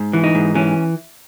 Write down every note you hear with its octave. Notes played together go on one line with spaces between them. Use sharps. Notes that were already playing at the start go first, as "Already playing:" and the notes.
Already playing: G#2
E3
D#4
G#2
E3 C#4